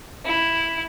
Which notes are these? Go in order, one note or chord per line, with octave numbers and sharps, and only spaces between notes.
E4